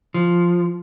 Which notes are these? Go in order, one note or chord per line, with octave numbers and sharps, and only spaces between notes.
F3